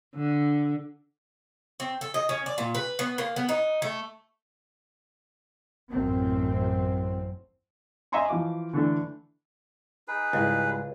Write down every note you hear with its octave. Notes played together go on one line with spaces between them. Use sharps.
D3
C4
A4
D#5
C#4
D5
A#2
B4
B3
A#3
B3
D#4
A3
A1 F#2 A2 C4
D#5 E5 G#5 A#5 C6 C#6
E3 F3 D6
D3 E3 A3 D4
D#4 G#4 B4
C#2 G#2 G3 E4